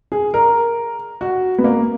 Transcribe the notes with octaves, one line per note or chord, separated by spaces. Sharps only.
G#4
A#4
F#4
B3
A#3